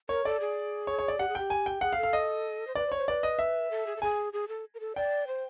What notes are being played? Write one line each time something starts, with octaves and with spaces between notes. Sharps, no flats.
A#4 C#5
A4 D5
G#4
C#5
C#5
D5
G4 F#5
G#4
G4 G5
G#5
G5
G#4 F#5
F5
A4
F5
D#5
C5
B4 D5
C5
C#5
C5
B4 D5
D#5
E5
A4
G#4
A4
G#4 G#5
G#4
A4
A#4
A4
D5 G5
C5